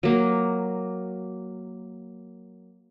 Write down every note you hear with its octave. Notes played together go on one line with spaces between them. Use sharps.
F#3 A#3